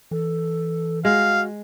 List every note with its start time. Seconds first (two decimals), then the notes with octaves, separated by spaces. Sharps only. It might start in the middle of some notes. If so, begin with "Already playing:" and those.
0.11 E3 A4
1.05 G#3 F#4 F5